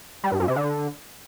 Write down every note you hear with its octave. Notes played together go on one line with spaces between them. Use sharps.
G3
G2
F#2
C3
D3